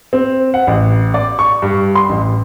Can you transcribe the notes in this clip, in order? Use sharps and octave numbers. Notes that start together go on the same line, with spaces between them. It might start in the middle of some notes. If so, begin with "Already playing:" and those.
C4
F#5
A1
D5
C#6
G2
C6
A1